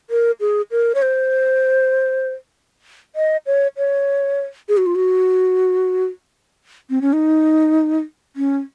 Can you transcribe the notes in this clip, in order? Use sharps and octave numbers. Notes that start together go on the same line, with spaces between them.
A#4
G#4
A#4
C#5
C5
D#5
C#5
C#5
G#4
F#4
F4
F#4
C4
C#4
D#4
C#4